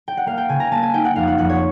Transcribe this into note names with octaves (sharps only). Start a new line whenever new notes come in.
G5
F#5
A#3 F5
G5
C#3 G#5
A#5
A#3 A5
G#5
D#4 G5
F#5
F2 F5
F#5
F2 F#5
C#5